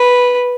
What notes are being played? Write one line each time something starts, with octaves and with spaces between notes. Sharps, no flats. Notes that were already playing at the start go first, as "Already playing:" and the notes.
Already playing: B4